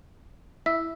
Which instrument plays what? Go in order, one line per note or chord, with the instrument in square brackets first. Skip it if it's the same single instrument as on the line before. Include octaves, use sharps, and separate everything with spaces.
[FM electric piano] E4 [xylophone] E6 B6